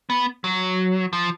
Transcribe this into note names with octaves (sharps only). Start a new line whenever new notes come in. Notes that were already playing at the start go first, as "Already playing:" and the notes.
B3
F#3
F3